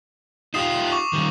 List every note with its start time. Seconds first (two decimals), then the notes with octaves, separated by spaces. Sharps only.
0.54 D#4 F4 G4 D#6 C7 E7
0.92 C#6 D6
1.13 D#3 G3